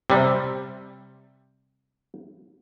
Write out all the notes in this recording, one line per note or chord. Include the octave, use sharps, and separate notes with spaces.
C3 G3